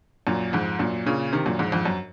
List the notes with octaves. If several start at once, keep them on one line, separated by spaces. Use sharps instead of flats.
F#2 A#2
F2 G#2
F#2 A#2
A#2 C#3
C3 D#3
F#2 A#2
F2 G#2
F2 G#2
F#2